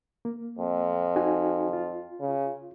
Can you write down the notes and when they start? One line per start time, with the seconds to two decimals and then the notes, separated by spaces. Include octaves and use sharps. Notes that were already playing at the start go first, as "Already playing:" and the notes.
0.25 A#3
0.58 F2
1.16 D#4 F#4 G#5
1.73 F4
2.21 C#3